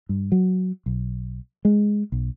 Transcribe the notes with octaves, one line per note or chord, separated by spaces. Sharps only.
G2
F#3
B1
G#3
B1